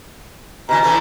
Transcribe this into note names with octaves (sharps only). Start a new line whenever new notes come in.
B2 D3 E3 A#5
A2 E3 A3